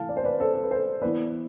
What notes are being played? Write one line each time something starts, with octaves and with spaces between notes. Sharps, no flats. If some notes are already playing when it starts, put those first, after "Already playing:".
Already playing: E3 A3 E4 F5 A5
D5
C5
B4 D5
A4 C5
A4
B4
A4 C5
E3 B3 E4 B4 D5